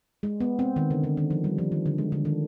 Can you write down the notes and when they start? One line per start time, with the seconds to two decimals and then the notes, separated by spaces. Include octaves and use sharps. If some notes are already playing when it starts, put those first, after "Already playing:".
0.23 G#3
0.40 B3
0.59 C4
0.76 D#3
0.91 D3
1.03 D3
1.17 D#3
1.30 F3
1.44 G3
1.58 F3
1.72 D#3
1.86 D3
1.98 G#3
2.12 D3
2.25 D#3